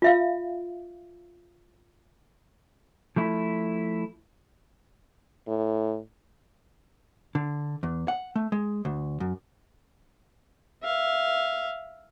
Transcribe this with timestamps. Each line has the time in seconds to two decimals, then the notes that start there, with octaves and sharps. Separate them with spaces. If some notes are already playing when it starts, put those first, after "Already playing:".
0.02 F4 E5 F5
3.16 F3 A3 E4
5.48 A2
7.35 D3
7.83 E2
8.08 F#5
8.36 A3
8.52 G#3
8.85 D2
9.20 F#2
10.83 E5 F5